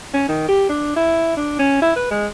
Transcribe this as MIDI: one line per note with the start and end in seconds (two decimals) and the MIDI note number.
0.14 0.25 61
0.29 0.44 51
0.49 0.69 67
0.70 0.92 62
0.96 1.32 64
1.37 1.58 62
1.59 1.81 61
1.82 1.92 64
1.96 2.06 71
2.11 2.27 56